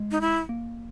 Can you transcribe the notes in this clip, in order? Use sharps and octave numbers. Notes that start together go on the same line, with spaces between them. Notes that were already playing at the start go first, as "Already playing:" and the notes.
Already playing: G#3
D#4
E4
A#3